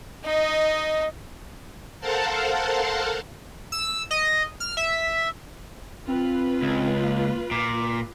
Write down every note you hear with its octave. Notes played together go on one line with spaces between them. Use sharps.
D#4 D#5
A4 A#4 C5 F5 F#5 A5
E6
D#5
F6
E5
C4 F4 B4
C#2
A#3
A#2 D6